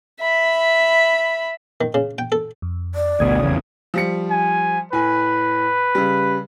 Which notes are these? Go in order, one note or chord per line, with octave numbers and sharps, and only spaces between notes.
E5 B5
D#3
C#3
G5
A4
F2
D5
A1 D2 B2 D#6 G#6
F1 E2 C#3
F3 G3 C#7
G#5
A2 B4 G#5
C#3 G3